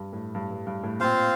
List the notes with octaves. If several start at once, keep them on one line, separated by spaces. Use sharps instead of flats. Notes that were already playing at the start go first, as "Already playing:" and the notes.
Already playing: G2
A2
G2
G2
G2
A2
A#2 C4 F4 C5 F5